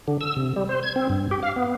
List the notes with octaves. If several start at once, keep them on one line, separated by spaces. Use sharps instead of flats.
D3
E6
C3
G3
C5
G#6
C4
G2
G4
F5
B3